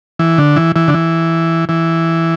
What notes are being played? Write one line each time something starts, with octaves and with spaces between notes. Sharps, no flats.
E3
D3
E3
E3
D3
E3
E3